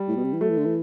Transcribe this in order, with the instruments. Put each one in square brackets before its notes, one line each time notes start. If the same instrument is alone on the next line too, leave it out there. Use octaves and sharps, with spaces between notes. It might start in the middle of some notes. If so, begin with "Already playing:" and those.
Already playing: [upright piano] G3
[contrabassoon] A2
B2
C3
E3
[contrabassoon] F#3 [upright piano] A3
[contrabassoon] E3
D3
E3